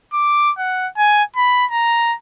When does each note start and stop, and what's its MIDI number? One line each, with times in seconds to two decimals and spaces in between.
0.13 0.51 86
0.59 0.88 78
0.97 1.23 80
1.36 1.66 83
1.71 2.14 82